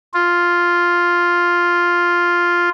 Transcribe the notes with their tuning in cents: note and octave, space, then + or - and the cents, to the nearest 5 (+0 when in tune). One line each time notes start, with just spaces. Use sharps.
F4 +0